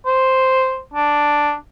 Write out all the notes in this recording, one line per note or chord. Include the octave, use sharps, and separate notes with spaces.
C5
D4